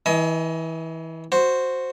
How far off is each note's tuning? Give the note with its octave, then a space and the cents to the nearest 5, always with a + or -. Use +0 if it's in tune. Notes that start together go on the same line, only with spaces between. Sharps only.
E3 -25 D#5 +15 G#5 +35
F#4 -5 C5 +0